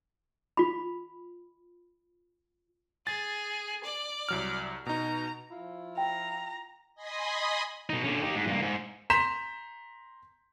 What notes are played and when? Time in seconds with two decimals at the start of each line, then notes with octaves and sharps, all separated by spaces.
0.57 F4 B5
3.07 G#4 A6
3.84 D5
4.29 C2 F#3 F6
4.86 B2 D#4 A#5
5.51 F3 E4 F4
5.98 G5 A#5
6.95 D#5 G#5 B5 C6 D#6
7.89 B2 D#4
8.03 D3 C#4
8.22 D#4 G4
8.36 G#2
8.47 G2 A#3
8.62 G#2
9.10 A#5 C6 G6 B6 E7